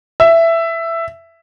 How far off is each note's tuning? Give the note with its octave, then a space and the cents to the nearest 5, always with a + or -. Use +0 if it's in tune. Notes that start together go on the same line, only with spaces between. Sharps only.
E5 +10